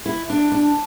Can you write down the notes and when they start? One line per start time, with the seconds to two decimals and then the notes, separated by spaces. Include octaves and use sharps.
0.06 E4
0.30 D4
0.52 D4